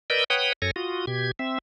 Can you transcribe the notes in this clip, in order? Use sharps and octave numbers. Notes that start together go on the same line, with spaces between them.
A#4 B4 D5 D#5 E6 G6
B4 C#5 F#5 G5 D#6
F#2 A4 C#5 G#5 A#6
F4 F#4 D#6
B2 G4 G#6
C4 E5